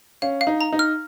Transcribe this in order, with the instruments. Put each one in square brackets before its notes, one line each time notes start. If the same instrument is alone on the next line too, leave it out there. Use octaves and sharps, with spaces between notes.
[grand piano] C#4 [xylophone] F5
[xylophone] F5
[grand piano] D#4
[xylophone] A#5
[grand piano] D#4
[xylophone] F6